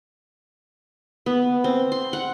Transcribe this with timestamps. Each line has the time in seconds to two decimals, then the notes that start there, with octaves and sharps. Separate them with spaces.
1.26 B3
1.64 C4
1.92 C6
2.13 F#5